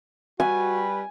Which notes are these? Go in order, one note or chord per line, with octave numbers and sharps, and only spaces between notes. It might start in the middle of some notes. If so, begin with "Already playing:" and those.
G3 F#4 B4 G#5